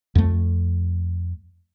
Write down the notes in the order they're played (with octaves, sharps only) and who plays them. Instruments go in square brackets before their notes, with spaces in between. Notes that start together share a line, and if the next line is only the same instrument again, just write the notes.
[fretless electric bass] F2 A3